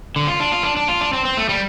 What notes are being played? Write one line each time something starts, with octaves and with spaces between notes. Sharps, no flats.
D3
F4
D4
F4
D4
D4
F4
D4
C4
C4
A3
G3